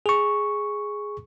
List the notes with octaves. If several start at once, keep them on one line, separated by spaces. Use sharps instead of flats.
G#4 C#6